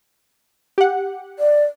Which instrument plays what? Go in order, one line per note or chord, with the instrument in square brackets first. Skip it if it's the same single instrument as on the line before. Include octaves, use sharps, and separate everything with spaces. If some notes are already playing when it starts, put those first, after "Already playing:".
[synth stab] G4 F#5
[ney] D5